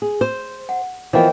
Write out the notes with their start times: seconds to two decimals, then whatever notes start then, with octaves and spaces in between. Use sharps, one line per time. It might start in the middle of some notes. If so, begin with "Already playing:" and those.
0.02 G#4
0.21 C5 E6
0.69 F#5
1.13 E3 F3 B3 A#4 C5 D#5 G5